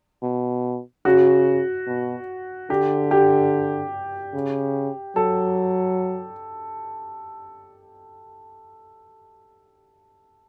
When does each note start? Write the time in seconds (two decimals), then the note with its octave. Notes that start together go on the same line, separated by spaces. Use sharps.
0.23 B2
1.05 C#3 F#4
1.87 B2
2.70 D3 G4
3.11 G4
4.34 C#3
5.16 F#3 A4